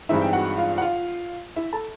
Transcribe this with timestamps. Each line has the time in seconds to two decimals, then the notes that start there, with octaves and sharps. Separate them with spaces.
0.09 G2 E3 G#3 C4 D#4 E4 E5
0.21 G5
0.33 F#4 F#5
0.57 F4 F5
0.78 F#5
0.82 F4 F5
1.56 E4 E5
1.73 A4 A5